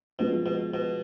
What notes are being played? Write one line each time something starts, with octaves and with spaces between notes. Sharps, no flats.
B2 F3 G#3 B3
B2
B2